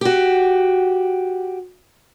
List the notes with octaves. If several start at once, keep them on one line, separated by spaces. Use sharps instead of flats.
F#4 G4